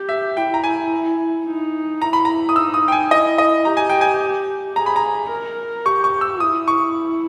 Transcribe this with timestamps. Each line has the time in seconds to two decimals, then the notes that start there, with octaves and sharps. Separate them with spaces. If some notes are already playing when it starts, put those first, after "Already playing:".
Already playing: G4
0.09 E5
0.37 E4 G5
0.54 A#5
0.64 G#5
1.46 D#4
2.01 E4 A#5
2.13 B5
2.25 A#5
2.49 D#6
2.56 D#4 E6
2.74 D#6
2.88 G5
2.92 G#5
3.11 E4 D#5
3.38 D#5
3.65 G4 A#5
3.77 G#5
3.89 G5
4.01 G#5
4.75 G#4 A#5
4.86 B5
4.96 A#5
5.30 A#4
5.86 G4 C#6
6.04 C#6
6.21 E6
6.40 E4 D#6
6.68 C#6